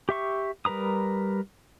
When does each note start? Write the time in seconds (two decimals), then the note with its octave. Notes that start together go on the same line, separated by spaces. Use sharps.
0.09 G4 E5 C#6
0.65 G3 A#4 B4 A#5 D#6